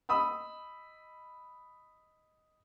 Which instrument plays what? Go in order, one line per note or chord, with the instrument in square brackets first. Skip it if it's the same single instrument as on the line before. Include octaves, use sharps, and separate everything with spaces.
[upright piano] D#5 B5 D#6 E6